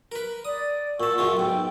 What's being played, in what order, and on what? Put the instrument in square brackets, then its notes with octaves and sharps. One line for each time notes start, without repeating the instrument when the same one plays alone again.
[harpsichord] A#4 B4
[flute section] D5 [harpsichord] D#6
[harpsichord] A#2 A5 [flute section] F#5 C#6 E6
[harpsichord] F#2 C#3 F4
[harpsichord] B1 G#2 [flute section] G5